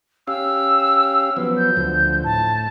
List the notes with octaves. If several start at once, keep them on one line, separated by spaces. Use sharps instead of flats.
C#4 G4 F5 E6
F3 F#3 B3
G6
D2 F3
A2 A5